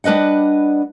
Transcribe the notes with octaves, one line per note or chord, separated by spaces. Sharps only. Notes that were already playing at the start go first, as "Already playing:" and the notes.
G3 D4 B4 D#5 F#5